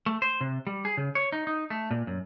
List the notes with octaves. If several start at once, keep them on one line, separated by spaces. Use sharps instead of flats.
A3
C5
C3
G3
G#4
C#3
C#5
D#4
D#4
A3
A#2
F#2